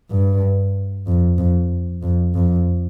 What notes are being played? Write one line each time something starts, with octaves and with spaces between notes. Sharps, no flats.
G2
F2
F2
F2
F2